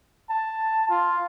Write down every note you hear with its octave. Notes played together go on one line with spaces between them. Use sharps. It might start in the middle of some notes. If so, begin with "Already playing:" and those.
A5
F4